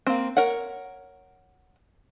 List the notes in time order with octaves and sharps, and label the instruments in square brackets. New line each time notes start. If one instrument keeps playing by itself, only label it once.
[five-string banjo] A#3 C4
A#4 C#5 F#5